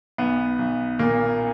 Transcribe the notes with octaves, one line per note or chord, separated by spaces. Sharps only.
B1 B3
B1
A#2 A#3